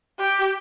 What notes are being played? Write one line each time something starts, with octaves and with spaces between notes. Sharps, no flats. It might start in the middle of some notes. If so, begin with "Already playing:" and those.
G4